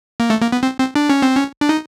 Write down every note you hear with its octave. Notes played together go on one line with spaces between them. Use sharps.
A#3
A3
A#3
B3
C4
C4
D4
C#4
C4
C#4
D4
D#4